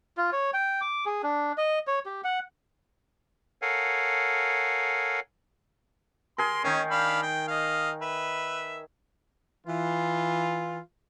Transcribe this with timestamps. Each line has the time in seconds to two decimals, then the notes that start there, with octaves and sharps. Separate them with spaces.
0.17 F4
0.33 C#5
0.54 G5
0.81 D6
1.06 G#4
1.23 D4
1.58 D#5
1.87 C#5
2.06 G4
2.24 F#5
3.62 A4 A#4 C#5 F5 F#5 G#5
6.38 G#4 A#4 C6
6.64 D#3 C#4 D#4
6.91 D4 F5 B5
7.23 G5
7.48 D#5 F5
8.02 B4 E5
9.67 E3 F4